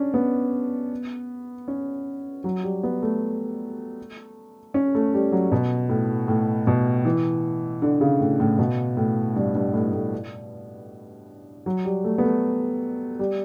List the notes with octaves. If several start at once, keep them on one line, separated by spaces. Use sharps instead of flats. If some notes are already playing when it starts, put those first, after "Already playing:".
Already playing: C#4 D4
B3
C#4
F#3
G3
B3
A3
C#4
A3
G3
F#3
B2
A2
A2
B2
E3
D3
C#3
A2
A2
B2
A2
G2
G2
A2
A2
F#3
G3
A3
B3
A3
G3